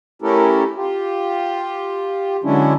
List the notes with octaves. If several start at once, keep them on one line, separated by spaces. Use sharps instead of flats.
A3 C#4 E4 G4 A4 A#4
F4 G4
D3 F#3 G#3 C#4 D4 E4